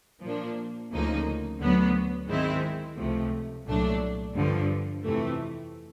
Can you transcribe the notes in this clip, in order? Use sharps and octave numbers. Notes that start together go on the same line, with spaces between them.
A#2 F3 A#3 D4
D2 C#3 F3 A#3 D#4
D2 D3 F#3 B3
G#2 D#3 G#3 C4 E4
C#2 C3 F3 A3
C2 A#2 F#3 A3 D4
G2 D3 F3
F2 C3 E3 A3